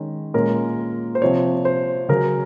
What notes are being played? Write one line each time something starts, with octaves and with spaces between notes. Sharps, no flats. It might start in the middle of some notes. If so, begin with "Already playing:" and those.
Already playing: D#3 G#3 C#4
A#2 G#3 C#4 A#4
C5
C3 F3 C4 C#5
C5
C#3 F#3 C#4 A#4